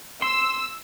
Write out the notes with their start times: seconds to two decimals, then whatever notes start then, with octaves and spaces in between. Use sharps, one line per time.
0.22 C6 E6